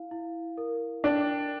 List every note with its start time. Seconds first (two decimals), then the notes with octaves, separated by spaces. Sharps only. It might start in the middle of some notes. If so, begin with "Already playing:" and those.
Already playing: E4 F5
0.11 E4
0.57 A#4
1.04 D4 G5